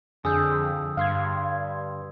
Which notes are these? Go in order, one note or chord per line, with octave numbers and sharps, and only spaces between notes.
F2 D3 G#4 D#6 E6 G6
G2 F5 C6 G#6